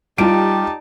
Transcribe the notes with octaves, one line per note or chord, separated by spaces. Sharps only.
G3 D#4 F4 G4 A5 D7